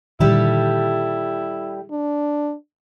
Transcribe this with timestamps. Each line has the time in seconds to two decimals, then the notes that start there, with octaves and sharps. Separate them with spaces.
0.20 A#2 D3 D#3 G3 E4 G4 A4
1.91 D4